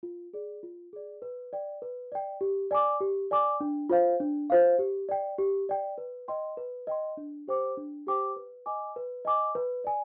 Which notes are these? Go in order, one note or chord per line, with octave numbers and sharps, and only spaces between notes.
F4
G#4 D5
F4
G#4 D5
B4
D5 G5
B4
D5 G5
G4
D5 G#5 D6
G4
D5 G#5 D6
D4
F4 C5 F5
D4
F4 C5 F5
G4
D5 G5
G4
D5 G5
B4
D#5 G5 C6
B4
D#5 G5 C6
D4
G4 C5 G5 D6
D4
G4 C5 G5 D6
B4
D#5 G#5 D6
B4
D#5 G#5 D6
B4
D5 G#5